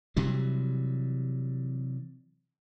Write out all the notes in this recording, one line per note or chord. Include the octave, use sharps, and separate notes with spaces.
C3 E3 F#3 G3